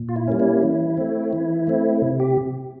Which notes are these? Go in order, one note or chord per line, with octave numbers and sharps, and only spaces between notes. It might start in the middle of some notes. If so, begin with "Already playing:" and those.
Already playing: A#2
F4
E4
G3 A#3 C#4
E4
E3
A3 C4
E3
A3 C4
C3
G4